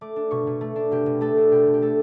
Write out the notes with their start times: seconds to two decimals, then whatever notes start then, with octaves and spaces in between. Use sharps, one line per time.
0.01 A3 D6
0.16 D4
0.31 B2 C#6
0.47 B2
0.61 A3
0.76 D4
0.91 B2 G4
1.06 B2
1.21 A3 A4
1.37 D4
1.51 B2 G4
1.67 B2
1.73 G4
1.82 A3 A4